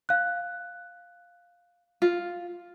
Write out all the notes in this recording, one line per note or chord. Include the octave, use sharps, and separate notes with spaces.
F5 F#6
F4